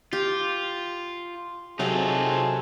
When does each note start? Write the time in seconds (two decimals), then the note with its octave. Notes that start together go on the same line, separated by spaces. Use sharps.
0.13 F4 G4
1.79 C3 F#3 C4 D#4 F4 G#4 A4